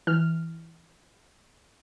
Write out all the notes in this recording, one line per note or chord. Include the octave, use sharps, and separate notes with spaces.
E3 F6